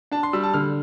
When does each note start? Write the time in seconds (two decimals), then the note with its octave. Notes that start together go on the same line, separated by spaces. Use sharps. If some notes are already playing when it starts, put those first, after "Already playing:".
0.11 D4 A5
0.23 C6
0.33 G3 E6
0.43 A5
0.53 D3 F6